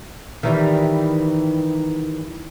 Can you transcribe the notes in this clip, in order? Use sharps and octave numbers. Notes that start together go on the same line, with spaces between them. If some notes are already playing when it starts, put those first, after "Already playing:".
D#3 E3 G3